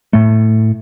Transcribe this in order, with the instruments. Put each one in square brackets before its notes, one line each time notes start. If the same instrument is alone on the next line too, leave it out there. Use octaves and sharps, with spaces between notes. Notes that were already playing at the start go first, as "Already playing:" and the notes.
[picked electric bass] A2 A3